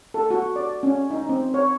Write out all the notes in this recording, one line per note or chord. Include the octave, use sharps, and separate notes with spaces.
A4
F#4
D5
C#4
D#4
C4
C#5